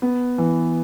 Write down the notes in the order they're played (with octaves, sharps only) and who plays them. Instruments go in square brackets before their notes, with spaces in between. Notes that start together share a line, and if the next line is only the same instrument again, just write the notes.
[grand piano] B3
E3